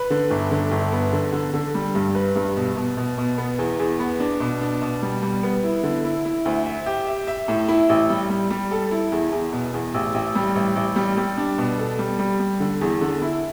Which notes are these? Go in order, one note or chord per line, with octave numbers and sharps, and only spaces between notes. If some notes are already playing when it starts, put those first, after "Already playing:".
Already playing: B4
D3
G1
D3
G1
B3
D3
D3
D3
G3
G2
B4
G2
B2
B2
B2
B2
B3
E2
E2
B3
D4
B2
D4
B2
G3
G3
B3
E4
D3
E4
E4
D2
E5
G4
E5
E5
A2
E4
A1
G3
G3
G3
A4
E4
E2
E2
B2
E2
A1
A1
G3
A1
A1
G3
G3
D4
B2
A4
G3
G3
G3
D3
E2
D3
E4